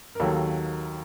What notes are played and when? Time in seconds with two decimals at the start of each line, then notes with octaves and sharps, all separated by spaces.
0.15 A#4
0.20 D#2 D#3 F#3 A#3 A4